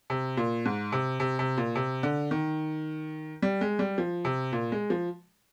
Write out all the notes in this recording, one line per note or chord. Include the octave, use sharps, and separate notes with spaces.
C3
A#2
G#2
C3
C3
C3
A#2
C3
D3
D#3
G3
G#3
G3
F3
C3
A#2
G#3
F3